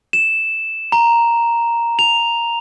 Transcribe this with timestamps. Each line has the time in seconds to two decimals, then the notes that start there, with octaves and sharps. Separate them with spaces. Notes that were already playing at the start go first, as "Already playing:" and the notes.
0.13 E7
0.92 A#5
1.99 F7